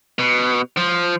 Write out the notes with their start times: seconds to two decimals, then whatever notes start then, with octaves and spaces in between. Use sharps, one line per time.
0.19 B2
0.77 F3